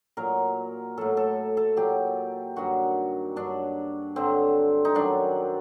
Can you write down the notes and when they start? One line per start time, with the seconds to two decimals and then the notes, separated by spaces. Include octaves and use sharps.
0.17 A#2 F#3 A#4
0.97 A2 F#3 A4
1.17 A4
1.57 A4
1.76 A#2 F#3 G4
2.56 G2 D#3 F#3 F#4
3.36 G2 F#3 D4
4.16 G2 D3 F#3 C4
4.85 D#4
4.95 F#2 D#3 F#3 D4